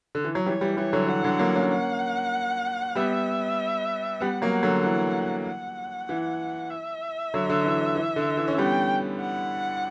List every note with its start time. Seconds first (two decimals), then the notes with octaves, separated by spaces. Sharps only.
0.15 D3
0.24 E3
0.35 F#3
0.46 E3 G3 C#5
0.61 E3 G3
0.77 E3 G3 C#5
0.93 D3 F#3
1.08 E3 F#5
1.24 D3 F#3
1.39 F#3 A#3
1.55 A#3 C#4
1.71 F#5
2.95 G3 B3 E5
4.20 G3 B3 F#5
4.42 F#3 A#3
4.52 F#5
4.63 D3 F#3
4.84 E3 F#5
5.45 F#5
6.09 E3
6.70 E5
7.34 D3 F#3
7.49 D3
7.64 E3
7.96 E3
8.16 D3
8.37 E3
8.48 C#4
8.58 G3 B3 G5
9.20 F#5